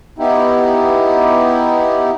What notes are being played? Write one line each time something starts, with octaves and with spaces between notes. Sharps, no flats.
B3 D#4 E4 G4